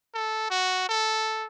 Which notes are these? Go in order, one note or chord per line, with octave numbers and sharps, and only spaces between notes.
A4
F#4
A4